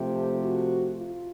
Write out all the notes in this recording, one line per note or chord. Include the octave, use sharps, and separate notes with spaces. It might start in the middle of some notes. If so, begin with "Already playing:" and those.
Already playing: C3 F3 A3 G4
F#4
F4